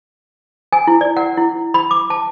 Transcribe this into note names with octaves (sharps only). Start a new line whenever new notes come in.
G#5
E4
D5
F#5
E4
B5
D6
A5